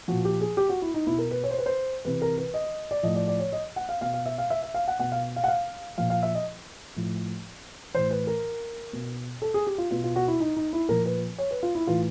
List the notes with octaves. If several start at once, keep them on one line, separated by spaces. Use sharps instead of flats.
A#2 F3 F#4
G4
G#4
G4
F#4
E4
D#4
B2 E4
A#4
B4
C#5
C5
B4
C5
C3 E3 B4
A#4
B4
D#5
D5
A2 F3 D#5
D5
D5
C#5
D#5
F#5
F5
B2 F5
F5
E5
F5
E5
E5
F5
F#5
B2 F#5
F5
F5
F#5
F5
A#2 F3 F5
F5
E5
D#5
A2 F3
A2 E3 C5
B4
A#4
B2
A4
G#4
G4
F4
B2 F4
F4
F#4
E4
D#4
D#4
E4
A#2 F3 A#4
B4
C#5
B4
F4
E4
A2 E3 F4